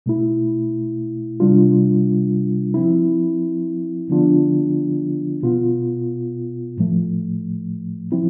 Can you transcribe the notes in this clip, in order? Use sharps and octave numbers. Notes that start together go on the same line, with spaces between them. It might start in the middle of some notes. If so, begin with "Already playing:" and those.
B2 A3 E4
C3 G3 D4 F4
F3 C4 E4
D3 F3 B3 D4 F4
B2 B3 F4
A2 F3 A3
F3 C4 E4